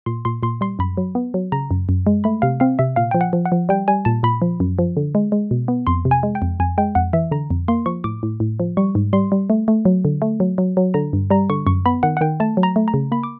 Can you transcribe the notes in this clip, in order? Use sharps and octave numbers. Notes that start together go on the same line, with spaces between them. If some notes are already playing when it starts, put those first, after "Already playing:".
A#2 C6
A#2 C6
A#2 C6
G3 C6
F#2 B5
F#3
B3
F#3
C#3 A#5
F#2
F#2
G#3
A3 B5
C3 F5
C4 F5
C3 E5
A#2 F5
F3 G5
F#5
F3
F#5
F3
G3 G5
G3 G#5
A#2 A5
A#2 B5
F3
F#2
F3
D3
G#3
G#3
B2
B3
F2 C6
C3
G#5
G#3
G5
F2
F2 G#5
G#3 G5
F2 F#5
E3 E5
D3 A#5
F2
A#3 C6
F3 C#6
A2 D6
A2
A2
F3
G3 C#6
G#2
G3 C6
G3
A3
A3
F#3
D3
A3
F#3
F#3
F#3
D3 A#5
G2
G3 A#5
D3 C#6
F#2 C#6
B3 B5
D#3 F#5
F#5
D#3 G5
A3 A5
F#3
A#5
A3
A#5
C#3
A#3 B5
D6